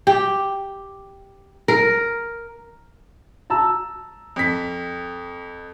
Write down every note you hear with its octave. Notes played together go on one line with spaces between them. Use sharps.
G4
A#4
A5 A#5 E6
F2 B6